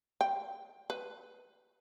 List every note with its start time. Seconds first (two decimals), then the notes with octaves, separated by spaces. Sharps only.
0.21 G5
0.90 B4